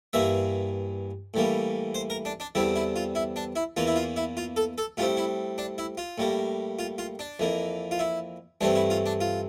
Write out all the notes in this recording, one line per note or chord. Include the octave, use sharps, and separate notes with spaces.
G2 E3 A#3 E5
A2 E3 G3 A#3
C5
A#4
D4
D4
E2 D3 G3 C4 E4
E4
F4
E4
D4
E4
E2 E3 A#3 F4
E4
F4
E4
F4
A4
A4
A2 G3 C4 F4
E4
D4
E4
F4
A2 G3 A#3
F4
F4
D4
F2 E3 A#3
F4
E4
G2 E3 A3 C4 D4
E4
F4
D4
F4